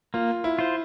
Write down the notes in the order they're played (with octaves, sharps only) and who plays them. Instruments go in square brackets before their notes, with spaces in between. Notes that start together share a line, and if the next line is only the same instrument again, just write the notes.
[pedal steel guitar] A#3 [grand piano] F4
[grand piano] E4
[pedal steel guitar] F4 C5